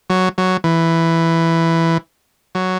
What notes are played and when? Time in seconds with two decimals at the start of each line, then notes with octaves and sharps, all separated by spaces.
0.10 F#3
0.38 F#3
0.64 E3
2.55 F#3